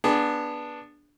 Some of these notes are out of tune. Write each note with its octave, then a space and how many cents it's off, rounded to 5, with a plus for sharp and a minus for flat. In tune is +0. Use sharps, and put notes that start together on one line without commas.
B3 -15 D4 +0 G#4 +0